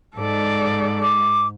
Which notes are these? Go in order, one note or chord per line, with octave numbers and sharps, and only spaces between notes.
G#2 A4 D5
D6